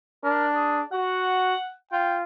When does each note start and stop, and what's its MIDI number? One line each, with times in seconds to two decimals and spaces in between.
0.24 0.82 62
0.24 0.46 70
0.54 0.80 68
0.92 1.54 66
0.92 1.73 78
1.92 2.24 65
1.92 2.17 79